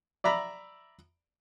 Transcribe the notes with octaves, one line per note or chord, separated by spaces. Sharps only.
D5 E5 A#5 B5